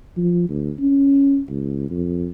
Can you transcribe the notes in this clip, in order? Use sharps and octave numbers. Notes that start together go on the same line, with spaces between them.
F3
D2
C#4
C#2
F2